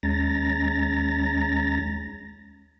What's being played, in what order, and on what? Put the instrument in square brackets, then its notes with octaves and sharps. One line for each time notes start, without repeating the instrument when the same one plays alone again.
[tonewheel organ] D#2 G#3 C#4 A#5 A6 A#6